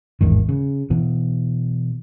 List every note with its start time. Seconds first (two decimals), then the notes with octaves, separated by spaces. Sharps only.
0.21 A1 E2 G#2 D#3
0.49 C#3
0.90 B2 E3